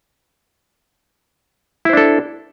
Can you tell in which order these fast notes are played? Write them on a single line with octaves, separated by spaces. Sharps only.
E4 C5 D4 A4